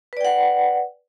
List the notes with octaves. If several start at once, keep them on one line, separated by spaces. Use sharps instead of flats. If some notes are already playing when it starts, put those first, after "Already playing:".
B4 D5 F#5 G5